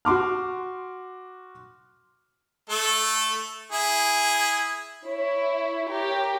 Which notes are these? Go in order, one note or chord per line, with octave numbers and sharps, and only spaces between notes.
F#4 C6 D6 F6
A3 A4
E4 G#4
E4 C#5
G4 A#4